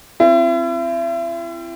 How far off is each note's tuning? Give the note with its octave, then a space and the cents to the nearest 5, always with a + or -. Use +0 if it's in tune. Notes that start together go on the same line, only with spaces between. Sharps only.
C4 +0 E4 +40